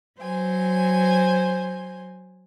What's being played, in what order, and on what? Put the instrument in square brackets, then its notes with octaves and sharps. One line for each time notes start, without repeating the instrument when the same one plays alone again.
[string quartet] F#3 C5 G#5